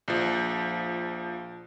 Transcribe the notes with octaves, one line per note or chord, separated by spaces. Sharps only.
A#1 F3